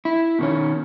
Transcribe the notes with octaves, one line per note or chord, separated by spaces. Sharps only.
E4
B2 D#3 C#4